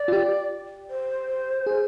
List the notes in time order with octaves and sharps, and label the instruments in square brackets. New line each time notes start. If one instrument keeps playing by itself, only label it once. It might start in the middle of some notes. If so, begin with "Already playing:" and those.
Already playing: [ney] D5
[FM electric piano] F4
G4
[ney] C5
[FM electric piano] G#4